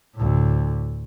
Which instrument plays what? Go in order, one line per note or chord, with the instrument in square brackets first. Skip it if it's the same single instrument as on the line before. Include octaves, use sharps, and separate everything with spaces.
[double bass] D2 A2